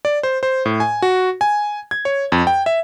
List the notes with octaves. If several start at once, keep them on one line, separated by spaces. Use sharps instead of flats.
D5
C5
C5
A2
G#5
F#4
G#5
G#6
C#5
F2
G5
E5